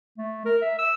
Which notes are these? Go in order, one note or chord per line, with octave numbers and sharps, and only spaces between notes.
A3
A#4
E5
E6